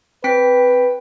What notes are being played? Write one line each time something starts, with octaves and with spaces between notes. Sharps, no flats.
C4 B4 G5 B6